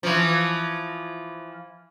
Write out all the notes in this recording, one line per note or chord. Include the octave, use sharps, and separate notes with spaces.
E3 F3